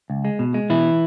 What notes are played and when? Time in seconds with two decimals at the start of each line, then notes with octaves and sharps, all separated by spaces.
0.10 C#2
0.25 G#3
0.39 B2
0.54 G#3
0.70 B2 E3 E4